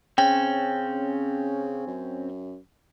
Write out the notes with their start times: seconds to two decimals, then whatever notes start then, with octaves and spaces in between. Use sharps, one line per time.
0.18 C#3 C4 C#4 G5
1.87 F#2